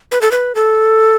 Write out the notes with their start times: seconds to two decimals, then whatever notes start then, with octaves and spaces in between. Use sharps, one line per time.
0.12 B4
0.21 A4
0.32 B4
0.55 A4